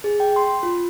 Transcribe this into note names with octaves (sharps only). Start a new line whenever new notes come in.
G#4
G5
C6
F4